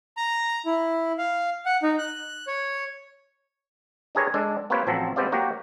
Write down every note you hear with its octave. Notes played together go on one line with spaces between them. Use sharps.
A#5
E4
F5
F#5
D#4
F#6
C#5
D4 G4 G#4 A#4 B4 C#5
G#3 D4 A4
A#3 C4 F4 G4 B4 C#5
A1 F3 F#3 C4 A4
G#3 B3 C4 G4 D5 F5
F#3 A#3 F#4 G4